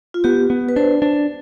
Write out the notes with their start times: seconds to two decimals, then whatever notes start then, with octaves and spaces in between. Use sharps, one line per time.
0.14 F4
0.24 B3 G4
0.50 B3
0.69 B4
0.76 D4 C5
1.02 D4